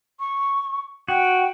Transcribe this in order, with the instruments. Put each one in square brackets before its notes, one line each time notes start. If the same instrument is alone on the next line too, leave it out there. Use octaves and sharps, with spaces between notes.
[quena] C#6
[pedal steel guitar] F#4 [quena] G5